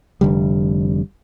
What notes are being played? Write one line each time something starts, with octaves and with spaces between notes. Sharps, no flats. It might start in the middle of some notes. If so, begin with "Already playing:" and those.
F1 D3 G3